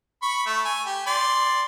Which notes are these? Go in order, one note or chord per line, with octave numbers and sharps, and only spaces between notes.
B5 C#6
A3
G#5
G4
D5 C6